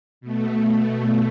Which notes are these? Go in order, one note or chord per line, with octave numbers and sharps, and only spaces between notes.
B2 A3